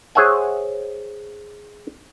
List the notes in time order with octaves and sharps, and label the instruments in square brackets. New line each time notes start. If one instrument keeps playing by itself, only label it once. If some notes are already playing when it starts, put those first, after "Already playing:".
[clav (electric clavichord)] G#4 C5 C#5 E5 F#5 G#5